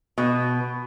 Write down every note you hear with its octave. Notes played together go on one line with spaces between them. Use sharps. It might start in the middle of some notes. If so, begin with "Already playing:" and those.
B2